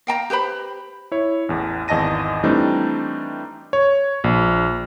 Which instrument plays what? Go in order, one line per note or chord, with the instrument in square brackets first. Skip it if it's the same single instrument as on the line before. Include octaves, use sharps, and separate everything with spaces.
[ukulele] F5 G5 A5 A#5
G4 B4 C5 B5
[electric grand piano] E4 C#5
A1 E2
G#1 E2 D#5 A5 A#6 D#7
E3 G3 A3 C4 D4 D#4
C#5
A#1